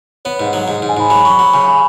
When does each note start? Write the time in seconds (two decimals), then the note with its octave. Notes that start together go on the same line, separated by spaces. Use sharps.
0.25 B3 C#5
0.40 G#2
0.46 F#5
0.53 F#3
0.68 G#2 F#5
0.82 G#2
0.89 G#5
0.97 G#2 B5
1.10 F#3 B5
1.25 F#3 C#6
1.39 F#3 B5
1.53 C#3 G#5
1.68 B5